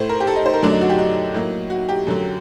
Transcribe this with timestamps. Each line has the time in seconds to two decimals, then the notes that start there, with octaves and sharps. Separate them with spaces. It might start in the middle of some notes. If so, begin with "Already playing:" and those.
Already playing: A2 A3 C5
0.09 A#4
0.20 G4
0.27 A4
0.36 D#4
0.46 C5
0.54 A#4
0.63 F#2 D3 F#3 A3 D4
0.72 D#4
0.81 F#4
0.89 G4
0.98 D#4
1.34 A2 F#3 A#3
1.70 F#4
1.89 G4
2.07 F#2 D3 F#3